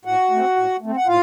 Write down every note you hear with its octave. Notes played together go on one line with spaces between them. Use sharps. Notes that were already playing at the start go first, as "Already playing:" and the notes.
A2 F#4 F#5
A3 C4
A2
A3 C4
F#5
A2 F4 F5